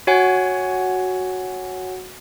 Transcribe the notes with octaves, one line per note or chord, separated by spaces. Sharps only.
F#4 C#5 F#5 G#5